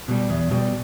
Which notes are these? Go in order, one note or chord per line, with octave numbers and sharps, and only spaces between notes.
B2 G3
E2
B2 G3